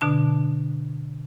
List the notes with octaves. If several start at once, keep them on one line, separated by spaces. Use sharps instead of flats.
B2 D3 D4 A5